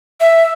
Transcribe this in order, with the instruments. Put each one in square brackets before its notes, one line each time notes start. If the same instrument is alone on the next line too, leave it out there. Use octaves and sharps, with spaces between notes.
[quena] E5